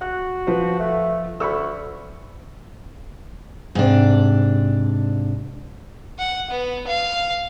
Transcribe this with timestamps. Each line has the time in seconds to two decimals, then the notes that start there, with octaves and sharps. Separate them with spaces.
0.01 F#4 F#6
0.47 F3 B4 C5
0.80 A3
1.40 D2 B5 C#6 E6
3.75 G#2 C3 D4
6.18 F#5
6.50 B3
6.87 F5